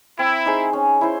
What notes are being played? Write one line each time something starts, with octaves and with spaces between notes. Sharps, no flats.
C4 E4
D#4 G#4 C5
C#4
E4 C5